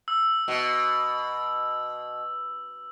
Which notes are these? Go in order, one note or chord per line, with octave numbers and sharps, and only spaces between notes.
E6
B2